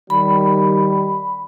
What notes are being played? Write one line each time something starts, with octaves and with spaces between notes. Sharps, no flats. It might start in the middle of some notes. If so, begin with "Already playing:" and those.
D#3 G3 B5